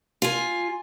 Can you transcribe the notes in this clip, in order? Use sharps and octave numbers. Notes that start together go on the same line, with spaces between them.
F4 G#5